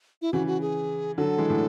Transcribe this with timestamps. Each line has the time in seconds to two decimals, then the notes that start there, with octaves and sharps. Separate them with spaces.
0.22 E4
0.33 C#3 E3 F#4
0.47 F#4
0.61 G#4
1.17 D3 F#3 A4
1.38 E3 G#3
1.50 A2